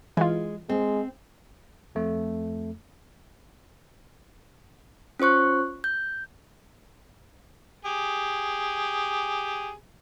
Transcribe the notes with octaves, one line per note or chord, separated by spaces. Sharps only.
E3 G#3 F4
G#3 C4
F2 A3
C#4 F4 C5 C#6 F#6
G6
G4 G#4